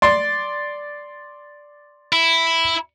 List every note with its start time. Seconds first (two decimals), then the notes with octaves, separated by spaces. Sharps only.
0.02 D5 C6
2.13 E4